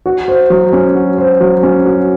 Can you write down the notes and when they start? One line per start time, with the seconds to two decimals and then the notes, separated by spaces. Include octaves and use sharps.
0.06 F#4
0.28 C5
0.50 F#3
0.73 C#4
0.95 F#4
1.18 C5
1.41 F#3
1.63 C#4
1.85 F#4